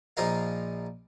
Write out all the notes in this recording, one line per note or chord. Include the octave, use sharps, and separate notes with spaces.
A#1 F3 D#4 A#4 F5